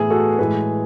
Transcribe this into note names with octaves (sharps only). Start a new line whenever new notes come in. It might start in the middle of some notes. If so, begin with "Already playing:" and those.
Already playing: A2 E3 B3 E4 G#4
F#4 A4
A2 E3 G#3 G#4 B4